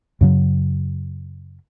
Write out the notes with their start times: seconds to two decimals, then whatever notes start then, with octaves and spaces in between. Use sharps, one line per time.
0.21 F#2 C#3 F#3